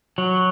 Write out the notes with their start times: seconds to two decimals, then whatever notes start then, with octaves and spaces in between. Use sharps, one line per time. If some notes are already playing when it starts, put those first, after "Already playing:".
0.18 F#3